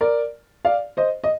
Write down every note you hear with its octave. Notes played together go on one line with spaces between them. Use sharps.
A#4 D5
D5 F5
C5 D#5
D#5